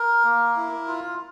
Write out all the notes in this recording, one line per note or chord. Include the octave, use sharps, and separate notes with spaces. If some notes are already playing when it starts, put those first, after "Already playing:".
Already playing: A#4
A#3
E4
F4